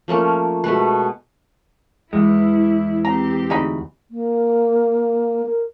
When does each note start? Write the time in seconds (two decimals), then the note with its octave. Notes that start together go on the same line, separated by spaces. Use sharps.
0.08 F3 A3 A#3 C#4
0.64 B2 G#3 A3 B4
2.13 E2 G#3 E4
3.05 C4 G4 A#5
3.50 D2 G#3 D#4 B5
4.11 A#3
5.46 A#4